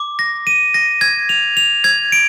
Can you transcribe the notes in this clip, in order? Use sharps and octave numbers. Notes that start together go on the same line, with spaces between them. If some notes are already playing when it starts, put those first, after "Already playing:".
Already playing: D6
A#6
D#7
A#6
G#6
F7
F7
G#6
D7